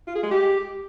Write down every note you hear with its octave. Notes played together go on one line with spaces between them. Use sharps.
F4
G#4
G#3
G4